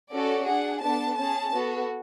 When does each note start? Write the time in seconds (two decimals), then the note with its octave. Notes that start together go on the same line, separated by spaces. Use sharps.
0.13 C#4 F#4 A4 D5
0.48 D4 G#4 F#5
0.83 B3 D4 A4 A5
1.18 C#4 G#4 A5
1.53 B3 F#4 A4